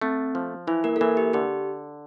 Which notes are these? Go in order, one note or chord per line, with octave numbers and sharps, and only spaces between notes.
A3 C4
F3
E3 E4
A#3 A#4
A4
E3 A#3 A#4
G4
D3 G4